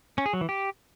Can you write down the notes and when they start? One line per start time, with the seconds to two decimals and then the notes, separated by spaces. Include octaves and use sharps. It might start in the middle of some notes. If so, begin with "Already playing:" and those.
0.18 C#4
0.26 G#4
0.33 F#3
0.41 E3
0.49 G4